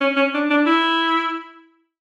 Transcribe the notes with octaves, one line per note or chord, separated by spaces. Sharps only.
C#4
C#4
D4
D4
E4